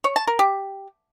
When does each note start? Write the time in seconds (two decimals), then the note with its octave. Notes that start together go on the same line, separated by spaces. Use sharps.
0.04 C#5
0.16 A5
0.27 A#4
0.39 G4